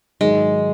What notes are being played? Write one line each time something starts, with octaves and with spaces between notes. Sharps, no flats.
G#2 D#3 F#3 G#3